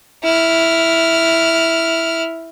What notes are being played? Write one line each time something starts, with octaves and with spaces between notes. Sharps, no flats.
E4 F6